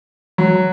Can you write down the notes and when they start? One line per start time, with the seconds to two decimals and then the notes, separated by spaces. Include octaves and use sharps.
0.38 F#3